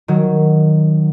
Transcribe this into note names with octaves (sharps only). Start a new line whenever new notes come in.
D#3 F#3